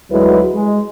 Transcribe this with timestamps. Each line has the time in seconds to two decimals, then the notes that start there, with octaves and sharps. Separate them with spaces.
0.12 D2 F#3 G#3 E4 F#4 B4
0.54 G#3